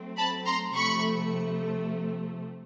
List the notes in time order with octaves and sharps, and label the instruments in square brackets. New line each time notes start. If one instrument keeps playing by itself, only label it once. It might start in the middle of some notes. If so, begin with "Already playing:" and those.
Already playing: [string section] F#3 A3 C4
[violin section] A5 B5
A#5 C6
[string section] C3 F3 A3 [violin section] B5 C#6